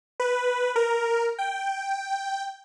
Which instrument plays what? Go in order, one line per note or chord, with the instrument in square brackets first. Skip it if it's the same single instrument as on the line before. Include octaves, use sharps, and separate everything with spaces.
[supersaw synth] B4
A#4
G5